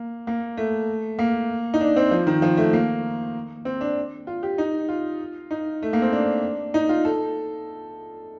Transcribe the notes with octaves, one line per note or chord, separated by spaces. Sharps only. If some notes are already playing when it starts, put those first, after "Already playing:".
Already playing: A#3
A#3
A3
A#3
D#4
D4
C4
F3
D#3
F3
A3
A#3
C4
D4
F4
G4
D#4
F4
D#4
A3
A#3
C4
D4
D#4
F4
A4